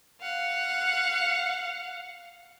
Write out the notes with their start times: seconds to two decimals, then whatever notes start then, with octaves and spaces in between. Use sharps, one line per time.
0.21 F5 F#5